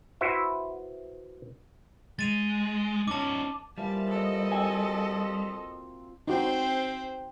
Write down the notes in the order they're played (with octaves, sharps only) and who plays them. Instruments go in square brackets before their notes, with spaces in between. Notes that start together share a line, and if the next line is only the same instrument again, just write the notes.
[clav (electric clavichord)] E4 F#4 B4 C5 E5
[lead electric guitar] G#3 [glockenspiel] A6 D#7 F7
[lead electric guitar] C#4 D#4 [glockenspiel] A5 D6
[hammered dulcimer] E3 F3 A#3 [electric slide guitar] G3 [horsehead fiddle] A5
[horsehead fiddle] A4 D#5
[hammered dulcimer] C4 F#4 [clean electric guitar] G#5
[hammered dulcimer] F4
[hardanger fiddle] C4 C5 [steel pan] D#4 F#4